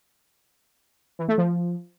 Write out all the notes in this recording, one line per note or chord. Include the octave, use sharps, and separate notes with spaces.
E3
A3
F3